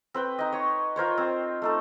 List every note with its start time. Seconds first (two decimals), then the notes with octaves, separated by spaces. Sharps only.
0.14 C4 B4 G5
0.39 D#4 D#5
0.52 C#5 C#6
0.96 F4 A#4 C5 C#5
1.18 C4
1.62 A3 D#4 A4